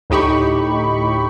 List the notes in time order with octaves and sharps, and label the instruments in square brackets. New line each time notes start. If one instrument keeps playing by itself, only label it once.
[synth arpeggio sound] D2 A2 D#4 G4 B5 C#6